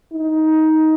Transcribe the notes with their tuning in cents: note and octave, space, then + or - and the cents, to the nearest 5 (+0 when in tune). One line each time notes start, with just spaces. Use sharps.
D#4 +15